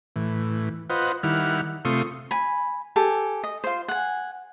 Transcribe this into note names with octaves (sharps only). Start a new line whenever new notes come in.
A2 E3
F4 B4 C5 D#5 F#5
D#3 G3 E4 F#5 F6
C3 A3 F4 C6 C#6 D#6
G#5 B5
G4 A4 G#5
D#5
F4 C5
F#5 G#5